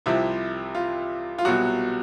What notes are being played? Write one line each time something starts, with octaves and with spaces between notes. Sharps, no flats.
C2 C3 F3 E4
F4
F4
C2 B2 F#3 F#4